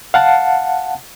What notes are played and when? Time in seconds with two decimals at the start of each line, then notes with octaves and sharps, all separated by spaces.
0.14 F5 F#5 A5